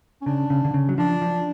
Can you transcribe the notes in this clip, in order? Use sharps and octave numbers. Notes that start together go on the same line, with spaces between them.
C#4
C#3 D4
C#3
D3
C#3
F#3
F3 D4
F3